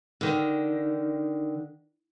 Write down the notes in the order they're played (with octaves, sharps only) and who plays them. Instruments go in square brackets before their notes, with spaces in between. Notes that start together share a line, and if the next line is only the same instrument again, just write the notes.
[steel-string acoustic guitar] D3 D#3